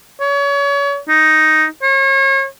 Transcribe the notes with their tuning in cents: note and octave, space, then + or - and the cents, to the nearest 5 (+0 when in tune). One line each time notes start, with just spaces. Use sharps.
C#5 +30
D#4 +5
C#5 -35